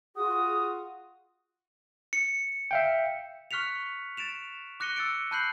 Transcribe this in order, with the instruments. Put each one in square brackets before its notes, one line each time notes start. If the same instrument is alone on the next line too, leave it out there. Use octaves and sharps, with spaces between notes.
[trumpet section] F4 F#4 [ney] G#4 [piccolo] D#6
[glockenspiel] C#7
[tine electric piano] E5 F5 G5
[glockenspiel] C#6 F6 F#6 B6 C#7 F7
A6 D7 E7 F7
D6 F#6 A#6 C#7 D#7 G7
E6 A6 C#7 D7
A5 B5 F#6 G6 C7 F#7